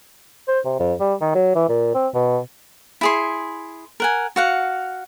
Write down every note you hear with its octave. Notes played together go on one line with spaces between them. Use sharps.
C5
C3
F2
G3
D#3
F#3
E3
A#2
C4
B2
E4 G#4 C6
A#4 F#5 G#5
F#4 F5 F#5